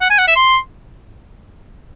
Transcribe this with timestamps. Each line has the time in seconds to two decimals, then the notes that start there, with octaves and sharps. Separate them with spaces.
0.01 F#5
0.10 G#5
0.19 F#5
0.27 E5
0.36 C6